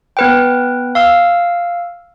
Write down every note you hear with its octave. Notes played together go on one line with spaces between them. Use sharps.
B3 B4 G5
F5 E6